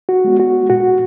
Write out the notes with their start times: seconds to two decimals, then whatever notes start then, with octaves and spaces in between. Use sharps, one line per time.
0.09 F#4
0.24 G#3 B3
0.40 F#4
0.70 A#2 F#4